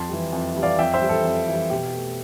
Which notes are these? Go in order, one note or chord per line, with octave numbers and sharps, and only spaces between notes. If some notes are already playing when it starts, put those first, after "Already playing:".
Already playing: F2 A5 C6
E3 G3
F2
E3 G3
D5 F5
F2 E5 G5
C5 E5
E3 G3
A4
F2
E3 G3
B2 G4
A3